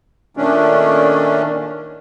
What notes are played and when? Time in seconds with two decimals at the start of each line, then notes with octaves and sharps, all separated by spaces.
0.37 A#2 D#3 A3 C#4 D4